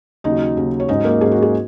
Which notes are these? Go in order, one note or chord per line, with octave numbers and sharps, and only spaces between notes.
D#2 C#3 F#3 D#4 D#5
D#2 C#3 F#3 D#4
C#5
G#2 F#3 C#4 D#4 D#5
A#3 A#4
G#2 F#3 C#4 G#4
F#4
G#4